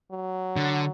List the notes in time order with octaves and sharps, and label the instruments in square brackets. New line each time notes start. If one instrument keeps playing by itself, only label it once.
[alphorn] F#3
[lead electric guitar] D3